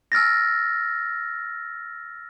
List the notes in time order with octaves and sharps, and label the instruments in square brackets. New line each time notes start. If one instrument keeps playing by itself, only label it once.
[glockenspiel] E6 F6 A6 A#6